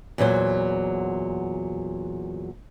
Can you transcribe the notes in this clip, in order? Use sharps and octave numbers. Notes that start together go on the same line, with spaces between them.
E2 A#2 F#3 C5